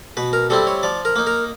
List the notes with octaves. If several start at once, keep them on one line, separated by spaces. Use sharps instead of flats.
B2 B4
A#4
G3 C4 E4 A4
C#5
F3 D5
A#4
A#3 D#4
A#4